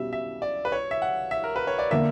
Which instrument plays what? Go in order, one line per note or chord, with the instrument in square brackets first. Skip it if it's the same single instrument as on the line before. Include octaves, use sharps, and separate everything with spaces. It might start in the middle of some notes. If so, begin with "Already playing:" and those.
Already playing: [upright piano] B2 G3 C#4 [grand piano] E5
[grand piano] E5
D5
B4
C#5
E5
F#5
E5
A#4
B4
C#5
D5
[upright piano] D3 A#3 D4 A#4 [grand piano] E5